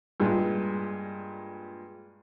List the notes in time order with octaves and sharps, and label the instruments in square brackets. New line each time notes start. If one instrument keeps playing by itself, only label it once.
[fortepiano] G2 A#2 G#3